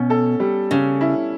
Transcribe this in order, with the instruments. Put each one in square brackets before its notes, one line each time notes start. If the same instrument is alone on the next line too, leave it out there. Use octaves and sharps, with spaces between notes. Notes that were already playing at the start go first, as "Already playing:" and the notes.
Already playing: [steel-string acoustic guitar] B2 [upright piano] C#4
[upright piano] A4
G3
[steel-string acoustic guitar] C#3 [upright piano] C#4
[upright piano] E4